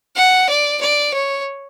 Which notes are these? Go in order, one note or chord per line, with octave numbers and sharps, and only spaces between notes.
F#5
D5
D5
C#5